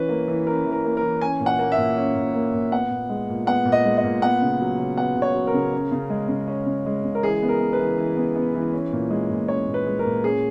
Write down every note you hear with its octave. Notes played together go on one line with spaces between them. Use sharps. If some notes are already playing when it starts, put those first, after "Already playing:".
Already playing: E3 C#4 B4
A#3
E3
C#4 A#4
E3
A#4
A#3
A#4
E3
C#4 G#5
A#2
F#5
A#3
E5
A#2
C#4
A#2
A#3
A#2
B3 F#5
A#2
G#3
A#2
B3 F#5
A#2
D#5
G#3
D#5
A#2
B3 F#5
C#3
F#3
C#3
B3 F#5
C#3
C#5
F#3
A#4
C#3
C#4
C#3
G#3
C#3
C#4
C#3
G#3
C#3
A#4
E3 G#4
B3
A#4
B3
B4
E3
E3
B3
B3
E3
C#4
A#2
G#3
A#2
C#4 C#5
A#2
B4
G#3
A#4
A#2
C#4 G#4